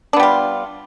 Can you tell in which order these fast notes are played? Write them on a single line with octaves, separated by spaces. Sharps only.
D4 B3 G3 F4